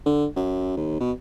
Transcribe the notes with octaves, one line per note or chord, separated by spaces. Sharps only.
D3
F#2
D#2
B2